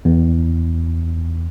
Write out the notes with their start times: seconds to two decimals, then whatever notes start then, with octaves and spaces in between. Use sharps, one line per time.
0.05 E2